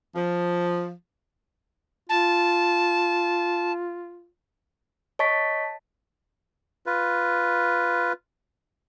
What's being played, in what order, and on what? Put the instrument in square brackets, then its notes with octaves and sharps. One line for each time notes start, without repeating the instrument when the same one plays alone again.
[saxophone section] F3
[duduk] F4 [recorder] A5
[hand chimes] C#5 D#5 A5 C#6 A6 B6
[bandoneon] F4 B4